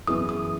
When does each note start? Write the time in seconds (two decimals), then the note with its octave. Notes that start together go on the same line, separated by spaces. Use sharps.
0.07 F#2 E3 B3 E4 G#4 D#6
0.29 D#6